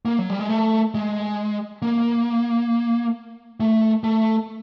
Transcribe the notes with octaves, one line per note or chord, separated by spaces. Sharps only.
A#3
F#3
G3
G#3
A3
G#3
A#3
A3
A3